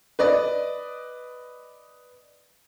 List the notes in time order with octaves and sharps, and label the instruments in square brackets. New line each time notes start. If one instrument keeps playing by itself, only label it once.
[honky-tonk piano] B4 D5 D#5